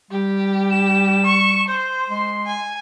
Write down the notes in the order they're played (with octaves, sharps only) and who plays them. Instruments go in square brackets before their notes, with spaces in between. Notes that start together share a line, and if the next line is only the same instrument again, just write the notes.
[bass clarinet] G3 [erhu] G4
[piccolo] E7
[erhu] C#6
[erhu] C5 [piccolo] G6
[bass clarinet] G#3 [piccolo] C6
[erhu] G#5